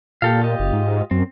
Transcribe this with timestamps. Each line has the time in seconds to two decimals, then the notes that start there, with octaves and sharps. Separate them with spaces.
0.22 A#2 G4 A4 F5
0.41 F4 G4 D#5
0.59 F#1
0.73 G#2
1.11 F#2 C4